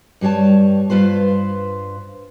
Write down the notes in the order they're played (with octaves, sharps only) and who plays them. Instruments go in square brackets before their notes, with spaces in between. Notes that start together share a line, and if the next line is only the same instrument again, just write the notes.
[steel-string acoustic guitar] G2 G3 G#4 C#5 A5
G2 F4 B4 C5